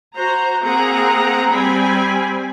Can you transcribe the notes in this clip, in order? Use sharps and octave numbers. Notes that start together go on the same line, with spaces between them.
F#4 C5 A#5
A#3 C4 G#4 F#5 A#5
G3 C4 G#5 B5